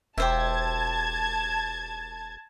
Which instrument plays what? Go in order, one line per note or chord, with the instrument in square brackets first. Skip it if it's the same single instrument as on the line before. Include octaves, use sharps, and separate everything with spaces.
[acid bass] E1 [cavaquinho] G4 C5 E5 [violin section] A5 G#6